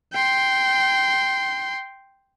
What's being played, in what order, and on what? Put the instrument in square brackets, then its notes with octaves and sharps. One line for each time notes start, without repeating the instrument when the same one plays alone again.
[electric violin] G5 C6